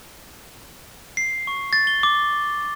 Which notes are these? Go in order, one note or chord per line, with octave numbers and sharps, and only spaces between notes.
C7
C#6
A6
G7
D6